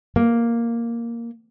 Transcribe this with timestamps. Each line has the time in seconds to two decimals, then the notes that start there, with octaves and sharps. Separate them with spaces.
0.16 A#3